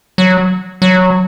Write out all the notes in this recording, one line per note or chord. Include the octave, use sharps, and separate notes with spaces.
F#3
F#3